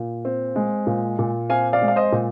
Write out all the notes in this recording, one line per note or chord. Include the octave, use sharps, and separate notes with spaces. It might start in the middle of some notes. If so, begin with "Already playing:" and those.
Already playing: A#2
C4
G#3
A#2
A#2
C4 F5 G#5
D5 F5
G#3
F5
C5 D#5
A#2